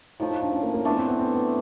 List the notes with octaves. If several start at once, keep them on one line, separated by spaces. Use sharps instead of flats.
A2 F3 A3 D#4
D#4
D4
C#4
A#3
A#3
E3 A3 B3 D4
C4
B3
C4
B3